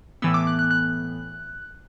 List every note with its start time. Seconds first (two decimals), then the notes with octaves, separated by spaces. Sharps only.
0.22 A2 E3 B3 E6
0.34 D6
0.47 F#6
0.59 F#6
0.71 F#6